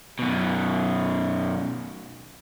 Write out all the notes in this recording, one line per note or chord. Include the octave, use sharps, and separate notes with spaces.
F#2 B2